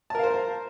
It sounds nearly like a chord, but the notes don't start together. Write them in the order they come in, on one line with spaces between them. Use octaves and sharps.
A5 A#4 F5 C5